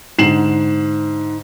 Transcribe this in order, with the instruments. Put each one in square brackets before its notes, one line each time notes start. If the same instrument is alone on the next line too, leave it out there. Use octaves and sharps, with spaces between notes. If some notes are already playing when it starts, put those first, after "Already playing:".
[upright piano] G#2 D3 C7 E7 F#7